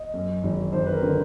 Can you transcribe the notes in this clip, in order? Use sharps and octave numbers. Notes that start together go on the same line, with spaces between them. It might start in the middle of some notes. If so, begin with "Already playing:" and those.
Already playing: D#5
F#2
G#1
G#1 C5
B4
A#4
D3